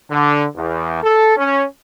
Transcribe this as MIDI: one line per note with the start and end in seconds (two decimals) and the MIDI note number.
0.11 0.46 50
0.56 1.02 40
1.04 1.36 69
1.37 1.65 61